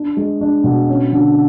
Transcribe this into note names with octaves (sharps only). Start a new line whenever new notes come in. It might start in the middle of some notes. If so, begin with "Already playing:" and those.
Already playing: D4
G#3
D4
B2
C#4
D3